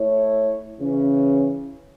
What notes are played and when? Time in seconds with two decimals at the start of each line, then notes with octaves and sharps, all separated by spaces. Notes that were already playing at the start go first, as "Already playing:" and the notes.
Already playing: A3 E4 C#5
0.80 C#3 E3 C#4